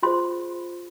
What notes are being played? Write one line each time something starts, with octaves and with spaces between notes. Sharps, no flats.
F4 G#4 C5 C6